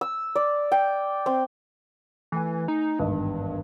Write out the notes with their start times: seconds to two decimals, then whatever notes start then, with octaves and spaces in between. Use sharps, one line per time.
0.01 E6
0.35 D5
0.72 G5
1.26 C4
2.32 E3 A3 G#5
2.68 D#4
2.99 G#1 E2 G2 D#5